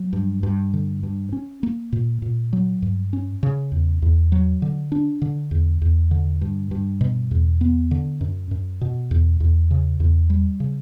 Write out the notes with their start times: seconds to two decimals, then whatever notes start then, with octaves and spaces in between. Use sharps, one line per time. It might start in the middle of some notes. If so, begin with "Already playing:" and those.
Already playing: F#3
0.13 G2
0.43 G2
0.74 D3
1.03 G2
1.33 C#4
1.63 A#3
1.92 A#2
2.22 A#2
2.53 F#3
2.82 G2
3.13 C#4
3.43 C#3
3.72 E2
4.02 E2
4.32 F#3
4.62 D3
4.92 D4
5.22 D3
5.51 E2
5.82 E2
6.11 D3
6.41 G2
6.71 G2
7.01 B2
7.31 E2
7.61 B3
7.91 D3
8.21 F#2
8.51 F#2
8.81 B2
9.11 E2
9.40 E2
9.71 C#3
10.00 E2
10.30 G3
10.60 C#3